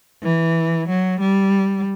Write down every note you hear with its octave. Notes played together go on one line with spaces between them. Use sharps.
E3
F#3
G3